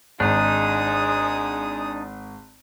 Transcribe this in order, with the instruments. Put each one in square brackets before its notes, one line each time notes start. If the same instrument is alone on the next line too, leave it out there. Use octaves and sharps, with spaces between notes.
[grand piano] G#1 [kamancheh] G#3 D#6 [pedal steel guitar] D4 D#4